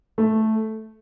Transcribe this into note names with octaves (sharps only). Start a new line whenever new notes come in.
A3